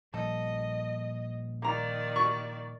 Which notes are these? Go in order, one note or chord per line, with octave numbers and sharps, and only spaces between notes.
A#2 F3 G3 A4 D#5
D#3 A#3 D5 A#5
C#6